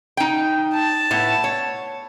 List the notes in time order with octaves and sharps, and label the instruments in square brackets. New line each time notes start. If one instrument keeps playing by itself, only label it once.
[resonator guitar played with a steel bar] D#4 G5
[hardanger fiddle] A5
[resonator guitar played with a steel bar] A2 B3
C#5